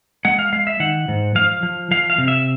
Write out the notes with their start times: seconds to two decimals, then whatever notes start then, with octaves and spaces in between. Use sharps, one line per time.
0.25 G#3 F#5
0.39 F5
0.53 G#3 F5
0.67 E5
0.80 D#3 F#5
1.08 G#2
1.35 F3 F5
1.63 F3
1.91 F3 F5
2.10 F5
2.18 C3
2.28 E5